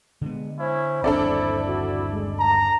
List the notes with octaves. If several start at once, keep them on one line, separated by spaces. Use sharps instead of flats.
D3 G#3 B3
C#4 E4 C5
G1 D#2 C4 D4 E4 A4 D5
F#4
G#3
A5 A#5